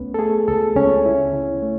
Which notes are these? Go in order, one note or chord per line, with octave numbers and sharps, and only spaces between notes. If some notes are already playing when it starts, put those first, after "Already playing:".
Already playing: C#2 A3 B3 C#4 B4
A4
A3 G#4
C#2 A4
C#2 C#4 C#5
E4
C#3
A3